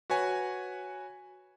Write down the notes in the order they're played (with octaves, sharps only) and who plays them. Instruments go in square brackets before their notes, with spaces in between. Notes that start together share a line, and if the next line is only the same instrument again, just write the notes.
[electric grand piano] F#4 B4 C#5 G#5